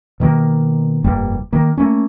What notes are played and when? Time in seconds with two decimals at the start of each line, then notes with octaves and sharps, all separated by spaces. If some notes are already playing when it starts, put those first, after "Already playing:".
0.20 B2 D#3 A#3
1.04 F1 G2 G3 A#3
1.53 D#3 A#3
1.77 A3 A#3 C#4